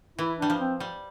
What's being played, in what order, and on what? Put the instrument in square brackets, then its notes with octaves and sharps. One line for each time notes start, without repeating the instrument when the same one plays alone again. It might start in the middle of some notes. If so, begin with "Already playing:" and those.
[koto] E3 [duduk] E4
[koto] G3 [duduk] D4
[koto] F3
[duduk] C4
[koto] G3